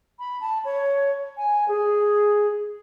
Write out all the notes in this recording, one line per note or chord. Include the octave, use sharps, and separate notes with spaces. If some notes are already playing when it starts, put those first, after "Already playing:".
B5
A5
C#5
G#5
G#4